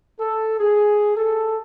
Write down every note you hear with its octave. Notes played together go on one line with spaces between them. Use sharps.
A4
G#4
A4